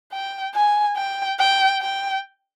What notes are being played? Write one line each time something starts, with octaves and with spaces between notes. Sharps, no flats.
G5
G#5
G5
G5
G5